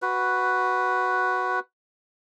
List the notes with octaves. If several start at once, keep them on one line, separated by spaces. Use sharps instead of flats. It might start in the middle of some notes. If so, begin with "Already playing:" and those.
F#4 B4